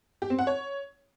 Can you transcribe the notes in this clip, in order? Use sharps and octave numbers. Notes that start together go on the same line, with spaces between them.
G4
C4
F#5
C#5